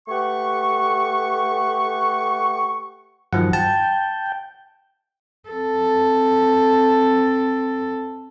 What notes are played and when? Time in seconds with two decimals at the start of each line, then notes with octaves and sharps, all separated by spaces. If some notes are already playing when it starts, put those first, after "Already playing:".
0.08 A3 G4 B4 F#5 C#6
3.33 G2 D#3 F3 F#3 F#5
3.53 G5 A5
5.49 C4 A4